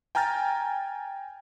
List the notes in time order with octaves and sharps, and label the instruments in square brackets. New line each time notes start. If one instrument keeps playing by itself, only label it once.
[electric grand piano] G5 G#5 A#5 F6 G6 A6